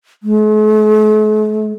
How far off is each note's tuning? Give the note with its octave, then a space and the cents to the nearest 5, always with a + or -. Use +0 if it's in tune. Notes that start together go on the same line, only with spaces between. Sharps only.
A3 -45